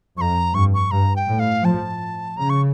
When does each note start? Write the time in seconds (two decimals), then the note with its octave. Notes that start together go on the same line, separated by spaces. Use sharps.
0.17 F2 A#5 C#6
0.54 G2 C#6
0.74 C#6
0.91 G2 A#5
1.16 G5
1.27 A2
1.39 F5
1.64 F3 A5
2.37 C#3 A#5
2.50 C#6